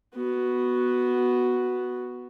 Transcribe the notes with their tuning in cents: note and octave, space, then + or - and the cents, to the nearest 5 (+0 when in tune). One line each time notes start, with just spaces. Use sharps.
B3 +0 F#4 +0